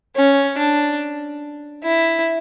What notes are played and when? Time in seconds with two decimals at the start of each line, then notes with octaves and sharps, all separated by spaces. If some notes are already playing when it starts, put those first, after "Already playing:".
0.16 C#4
0.58 D4
1.84 E4